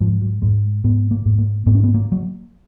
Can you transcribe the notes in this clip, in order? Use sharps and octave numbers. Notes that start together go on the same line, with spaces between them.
G#2 F3
F#3
G#2 G#3
G#2 B3
A#3
G#2
A#3
G#2 B3
C#4
B3
A#3
F#3